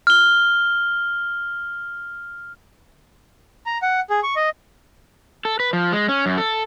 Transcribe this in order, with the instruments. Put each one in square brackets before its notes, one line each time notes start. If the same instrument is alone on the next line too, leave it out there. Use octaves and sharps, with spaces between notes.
[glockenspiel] F6 G7
[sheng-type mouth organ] A#5
F#5
G#4
C#6
D#5
[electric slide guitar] A4
B4
F3
G#3
C#4
F#2
A4